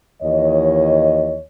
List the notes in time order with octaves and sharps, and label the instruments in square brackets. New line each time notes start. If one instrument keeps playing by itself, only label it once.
[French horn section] D#2 E3 C#5 D#5